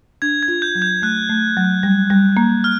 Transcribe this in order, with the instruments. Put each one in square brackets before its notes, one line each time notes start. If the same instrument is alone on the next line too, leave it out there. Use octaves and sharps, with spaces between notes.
[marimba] D4 [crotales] G#6
[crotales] G#6
[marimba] F4
[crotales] G6
[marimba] F#3
[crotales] G6
[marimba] A3 [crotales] F#6
[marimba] A3
F#3
G3
G3
A#3
[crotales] F6